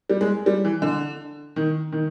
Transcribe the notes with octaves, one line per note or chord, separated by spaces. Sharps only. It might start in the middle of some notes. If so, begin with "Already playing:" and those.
G3
G#3
G3
E3
D3
D#3
D#3